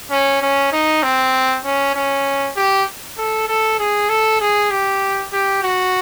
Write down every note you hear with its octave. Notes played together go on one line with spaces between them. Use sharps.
C#4
C#4
D#4
C4
C#4
C#4
G4
A4
A4
G#4
A4
G#4
G4
G4
F#4